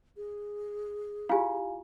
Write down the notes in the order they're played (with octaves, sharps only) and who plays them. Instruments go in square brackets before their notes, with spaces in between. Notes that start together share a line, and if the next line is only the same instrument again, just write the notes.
[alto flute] G#4
[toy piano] E4 F4 G4 [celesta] F5 G#5